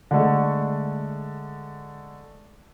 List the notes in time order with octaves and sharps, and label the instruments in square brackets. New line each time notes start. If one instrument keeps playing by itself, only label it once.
[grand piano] D3 G#3 A3